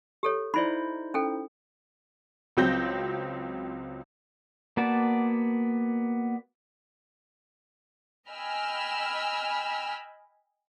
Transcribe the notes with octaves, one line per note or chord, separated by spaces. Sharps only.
G4 A4 C#5
D#4 E4 C5 D5 B5
C#4 A4 G5
C#2 F#3 C4 G6 A#6
A#3 B3 F#4 D5 A5
D#5 G5 G#5 B5 E6 F6